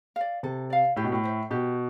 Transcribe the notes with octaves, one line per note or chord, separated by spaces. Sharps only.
D5 F5
C3 A4
D5 F5
A2 G4
B2
A2
C5 E5
B2 G4